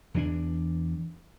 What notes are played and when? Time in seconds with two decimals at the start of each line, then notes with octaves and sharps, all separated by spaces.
0.14 E2 E3 A3 D4